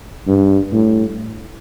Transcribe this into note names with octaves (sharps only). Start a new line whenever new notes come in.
G2
A2